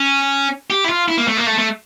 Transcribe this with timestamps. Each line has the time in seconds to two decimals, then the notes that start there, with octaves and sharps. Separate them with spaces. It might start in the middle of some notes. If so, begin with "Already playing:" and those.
Already playing: C#4
0.70 G4
0.84 E4
0.89 F4
1.08 E4
1.18 A#3
1.28 A3
1.37 A#3
1.46 A3
1.58 A3